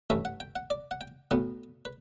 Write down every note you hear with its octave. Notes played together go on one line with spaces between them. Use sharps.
A1 G2 E3 A3 C#4 E5
F#5
G5
F#5
D5
F#5
G5
B1 A2 F#3 B3 F#5
B4